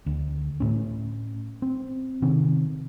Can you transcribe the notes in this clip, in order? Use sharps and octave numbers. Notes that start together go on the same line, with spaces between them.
D2
A2 C#4
C4
C3 D#3 C4